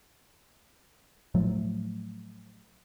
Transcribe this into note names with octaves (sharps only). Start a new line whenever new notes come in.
A2 F3 F#3 A3